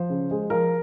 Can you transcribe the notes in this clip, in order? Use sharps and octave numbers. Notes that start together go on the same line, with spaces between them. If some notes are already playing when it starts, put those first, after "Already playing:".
Already playing: F3 C5
C#3
G#3
F3 A#4